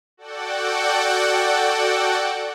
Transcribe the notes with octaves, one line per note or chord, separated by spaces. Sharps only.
F#4 A4 D5 F#5 G5